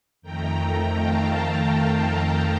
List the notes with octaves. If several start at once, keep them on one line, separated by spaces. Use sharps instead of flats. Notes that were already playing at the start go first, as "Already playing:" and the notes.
F2 D#3 A3 G5 A#5
F5 A5